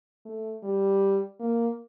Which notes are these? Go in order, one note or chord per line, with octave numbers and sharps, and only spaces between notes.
A3
G3
A#3